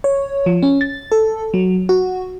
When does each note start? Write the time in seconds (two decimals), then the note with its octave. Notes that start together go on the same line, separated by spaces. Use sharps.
0.04 C#5
0.46 F3
0.63 C#4
0.81 A6
1.12 A4
1.54 F#3
1.89 F#4